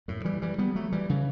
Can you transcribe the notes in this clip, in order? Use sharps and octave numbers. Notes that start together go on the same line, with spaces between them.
F#2 A2
E3 G3
E3 G3
G3 B3
F#3 A3
E3 G3
C#3 E3